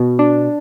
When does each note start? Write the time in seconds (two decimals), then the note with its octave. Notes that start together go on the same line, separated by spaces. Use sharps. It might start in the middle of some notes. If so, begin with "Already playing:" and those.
Already playing: B2
0.19 D4